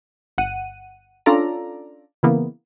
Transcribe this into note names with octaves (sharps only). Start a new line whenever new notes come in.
G1 F#5 D#7
C#4 D4 F4 A4 D5 A#5
C#3 E3 A#3 B3